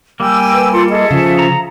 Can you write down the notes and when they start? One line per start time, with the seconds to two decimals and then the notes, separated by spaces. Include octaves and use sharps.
0.20 G3 A#3 G5 G#5 E6
0.53 B4
0.73 F4 A4 C6
0.90 G#4 A4 D#5 E5
1.11 C#3 F3
1.39 A#5